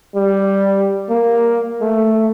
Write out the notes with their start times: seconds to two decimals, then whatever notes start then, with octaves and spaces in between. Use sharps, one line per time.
0.15 G3
1.10 A#3
1.81 A3